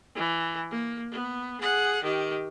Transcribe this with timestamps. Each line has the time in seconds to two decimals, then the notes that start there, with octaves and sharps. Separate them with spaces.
0.16 E3
0.71 A#3
1.12 B3
1.61 G#4 F#5
2.04 D#3 G4